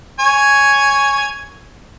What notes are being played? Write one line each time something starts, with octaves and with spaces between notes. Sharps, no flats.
C#5 G#5